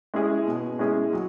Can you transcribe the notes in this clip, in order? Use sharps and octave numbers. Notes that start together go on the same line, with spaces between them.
G#3 C#4 E4 G#4
B2
G#3 C#4 E4 G#4
F#3